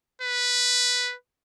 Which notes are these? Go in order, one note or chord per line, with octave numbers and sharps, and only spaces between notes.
B4